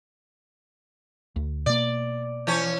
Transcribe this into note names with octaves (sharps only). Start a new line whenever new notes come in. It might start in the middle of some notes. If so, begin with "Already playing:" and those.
D2
B2 A#3 D5
E3 C#4 C#5